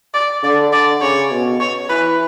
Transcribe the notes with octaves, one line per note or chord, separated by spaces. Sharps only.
D5
D3 D5
D5
C#3 C#5
B2
C#5
E3 B4